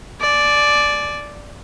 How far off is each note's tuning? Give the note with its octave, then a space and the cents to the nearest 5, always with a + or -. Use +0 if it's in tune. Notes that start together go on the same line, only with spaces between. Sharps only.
D5 +0 G#5 +45